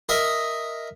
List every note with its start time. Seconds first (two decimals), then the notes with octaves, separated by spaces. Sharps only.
0.09 A#4 D#5 E5